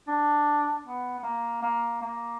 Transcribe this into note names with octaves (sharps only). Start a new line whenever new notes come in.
D4
B3
B3
A#3
A#3
A#3